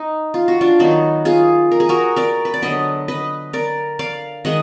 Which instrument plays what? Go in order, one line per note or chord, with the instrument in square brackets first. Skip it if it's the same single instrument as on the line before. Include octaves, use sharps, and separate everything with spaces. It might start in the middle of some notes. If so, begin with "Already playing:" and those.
Already playing: [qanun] D#4
F4
F#4
D4 F4
D#3 F#3 B3 D#4 F#4
F4 G#4
A#4
G#4
F#4 A#4
A#4 D5
B4
D5
D3 F#3 B3 B4 D#5
B4 D#5
A#4 D5
D5 F5
D#3 G#3 D#5 F#5